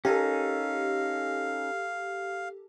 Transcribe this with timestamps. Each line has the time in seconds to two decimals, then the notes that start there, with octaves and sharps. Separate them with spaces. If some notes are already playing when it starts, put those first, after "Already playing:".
0.05 C#4 D#4 G4 A4 A#4 F5 G#5